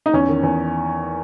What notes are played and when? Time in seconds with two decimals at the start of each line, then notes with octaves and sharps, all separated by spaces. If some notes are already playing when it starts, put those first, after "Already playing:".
0.06 D#4
0.14 E2 C#4
0.29 D#3
0.43 E2